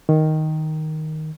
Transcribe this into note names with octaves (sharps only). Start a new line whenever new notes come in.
D#3